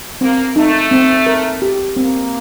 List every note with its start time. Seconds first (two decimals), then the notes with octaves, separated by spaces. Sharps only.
0.21 A#3 C4
0.56 A3 D#4
0.91 C4
1.26 A#4
1.62 G4
1.96 A#3 C4